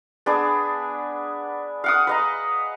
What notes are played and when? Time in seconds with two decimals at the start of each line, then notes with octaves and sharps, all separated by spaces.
0.26 B3 D4 G#4
1.84 F5 F#5 D#6
2.07 B4 D#5 A#5